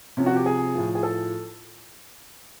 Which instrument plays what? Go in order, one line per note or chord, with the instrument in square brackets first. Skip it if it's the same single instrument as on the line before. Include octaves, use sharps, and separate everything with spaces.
[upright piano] C3 F3 C#4
F#4
G4
G#4
A2 F3
G#4
A4